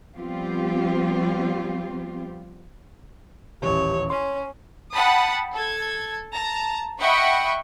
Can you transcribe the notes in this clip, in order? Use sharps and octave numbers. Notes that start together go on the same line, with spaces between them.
F3 G3 B3 C4 F4 G4
D#1 A1 G4 C#5
C#4 C#5 C6
F#5 G5 A5 B5 D#6
A4 G#6
A5 A#5
D#5 E5 F#5 G5 B5 C#6